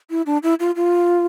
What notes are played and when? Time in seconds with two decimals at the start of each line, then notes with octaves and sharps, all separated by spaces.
0.10 E4
0.26 D4
0.43 E4
0.60 F4
0.76 F4